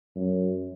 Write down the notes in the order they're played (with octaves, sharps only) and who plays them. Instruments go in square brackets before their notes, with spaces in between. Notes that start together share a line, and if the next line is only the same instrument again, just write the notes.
[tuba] F#2